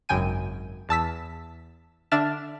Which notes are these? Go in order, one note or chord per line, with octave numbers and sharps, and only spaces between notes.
G#1 F#2 C#3 G5 G#5 D#7
E2 A5 E6 B6
D3 D4 E5 F6 A6 E7